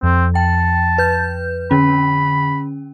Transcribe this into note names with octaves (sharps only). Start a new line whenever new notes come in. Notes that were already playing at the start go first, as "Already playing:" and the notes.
F2 C4
G5 A5
B4 G6
D3 C#4 B5